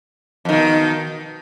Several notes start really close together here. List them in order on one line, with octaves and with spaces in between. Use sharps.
F2 D#3 B2